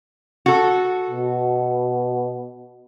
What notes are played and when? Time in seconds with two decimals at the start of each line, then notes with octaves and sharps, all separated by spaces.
0.46 F#4 A4
1.10 B2